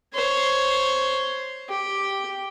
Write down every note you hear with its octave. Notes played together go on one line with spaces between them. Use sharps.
C5 C#5
G4